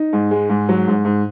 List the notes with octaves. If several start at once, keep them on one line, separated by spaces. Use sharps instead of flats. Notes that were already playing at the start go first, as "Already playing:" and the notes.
Already playing: D#4
G#2
G#3
G#2
F#3
G#2
G#2